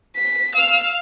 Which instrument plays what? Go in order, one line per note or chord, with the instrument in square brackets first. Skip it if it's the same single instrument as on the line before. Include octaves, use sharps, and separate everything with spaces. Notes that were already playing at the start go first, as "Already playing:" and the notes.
[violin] B6
[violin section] F5 F6 [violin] E6